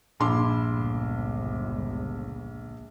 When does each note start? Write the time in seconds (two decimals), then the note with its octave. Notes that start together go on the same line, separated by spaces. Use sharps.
0.20 A#1 G2 E4 C6 D6
0.66 G1 C#2